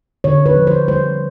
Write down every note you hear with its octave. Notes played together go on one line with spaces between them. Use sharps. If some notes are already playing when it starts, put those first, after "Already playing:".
D3 C#5
B4
F3
C5
G3 C5